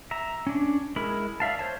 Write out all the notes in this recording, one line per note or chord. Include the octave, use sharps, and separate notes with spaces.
E5 A#5
C#4 D4
G#3 E4 A#4 B5
D5 E5 F5 A5
C5 C#5 A5